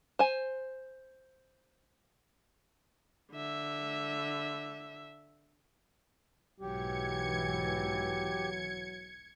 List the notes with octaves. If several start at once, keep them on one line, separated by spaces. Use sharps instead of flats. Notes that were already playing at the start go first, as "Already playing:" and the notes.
C5 G#5
D3 E5
B1 G#2 E3 F#3 G4 G#6 C#7